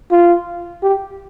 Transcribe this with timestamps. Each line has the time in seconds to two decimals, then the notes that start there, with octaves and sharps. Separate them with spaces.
0.11 F4
0.83 G4